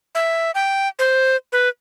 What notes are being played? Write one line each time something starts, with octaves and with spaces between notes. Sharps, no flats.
E5
G5
C5
B4